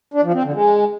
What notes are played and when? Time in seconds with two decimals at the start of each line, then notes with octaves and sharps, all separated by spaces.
0.14 D4
0.24 F3
0.34 C4
0.43 D3
0.53 G#3